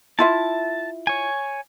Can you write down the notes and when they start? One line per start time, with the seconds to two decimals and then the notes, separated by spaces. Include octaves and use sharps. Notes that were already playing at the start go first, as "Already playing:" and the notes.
0.19 E4 F4 E5 A5
1.07 C#5 G#5